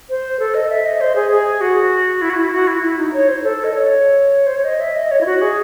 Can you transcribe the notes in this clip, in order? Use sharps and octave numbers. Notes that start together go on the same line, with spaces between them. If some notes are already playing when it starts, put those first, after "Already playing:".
C5
A4
D#5
E5
D#5
C5
G#4
G#4
F#4
E4
F#4
E4
F#4
E4
E4
D#4
C#5
C5
A4
D#5
C#5
C5
C#5
D#5
E5
D#5
C#5
E4
F#4
G#4